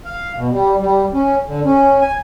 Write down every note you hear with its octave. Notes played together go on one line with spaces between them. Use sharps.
F5
B2
G3
G3
C#4
D3
C#4
G#5